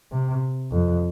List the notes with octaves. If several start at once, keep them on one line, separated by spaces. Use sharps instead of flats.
C3
F2